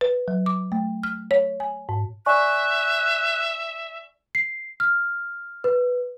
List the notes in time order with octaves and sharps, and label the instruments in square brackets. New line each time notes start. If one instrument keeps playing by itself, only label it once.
[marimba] B4
F#3
D6
A3
F6
C#5
G#5
G#2
[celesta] D5 G#5 C#6 [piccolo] E5 [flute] F#6
[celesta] C7
F6
B4